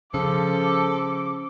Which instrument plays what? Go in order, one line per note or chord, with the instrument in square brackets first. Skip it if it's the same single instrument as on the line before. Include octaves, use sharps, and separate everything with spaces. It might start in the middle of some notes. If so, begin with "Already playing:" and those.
[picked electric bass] C#3 [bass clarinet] F3 [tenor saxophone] A4 [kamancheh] D6